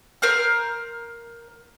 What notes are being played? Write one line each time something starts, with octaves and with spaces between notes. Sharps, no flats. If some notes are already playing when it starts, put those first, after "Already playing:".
A#4 C5 F6